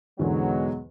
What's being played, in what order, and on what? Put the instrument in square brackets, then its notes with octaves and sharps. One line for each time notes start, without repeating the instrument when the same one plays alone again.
[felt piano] E2 G#2 D3 [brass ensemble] B2 F#3 G#3